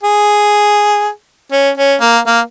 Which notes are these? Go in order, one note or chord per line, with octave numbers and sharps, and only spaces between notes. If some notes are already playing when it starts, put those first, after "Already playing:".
G#4
C#4
C#4
A#3
A#3